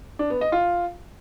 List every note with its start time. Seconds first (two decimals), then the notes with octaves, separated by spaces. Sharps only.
0.19 D4
0.30 B3
0.41 D#5
0.52 F4